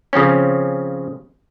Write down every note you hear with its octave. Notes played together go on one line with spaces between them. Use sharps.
C#3 F3 C4 C#4